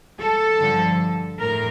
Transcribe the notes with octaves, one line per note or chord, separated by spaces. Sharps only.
A4
G2 D3 F3
A2 A#4